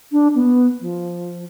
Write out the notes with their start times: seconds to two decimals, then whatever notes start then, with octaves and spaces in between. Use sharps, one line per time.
0.12 D4
0.35 B3
0.80 F3